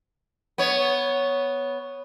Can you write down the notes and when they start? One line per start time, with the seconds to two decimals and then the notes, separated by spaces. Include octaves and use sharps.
0.58 B3 C#5